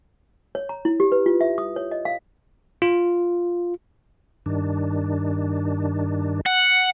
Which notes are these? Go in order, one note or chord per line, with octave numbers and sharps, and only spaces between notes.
C#5
A#5
E4
G4
B4
F4
E5
D#6
C#5
D#5
F5
F4
G2 D#3 D4
F#5